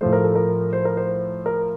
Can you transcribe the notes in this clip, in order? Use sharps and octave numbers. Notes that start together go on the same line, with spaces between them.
A2 F3 A3 C5
A#4
A4
A#4
C5
A#4
C5
A#4